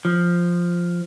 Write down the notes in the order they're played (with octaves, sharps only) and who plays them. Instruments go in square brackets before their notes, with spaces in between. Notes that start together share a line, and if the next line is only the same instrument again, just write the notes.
[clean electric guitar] F3